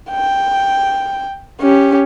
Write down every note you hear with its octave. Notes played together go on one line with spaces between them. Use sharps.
G5
C#4 G4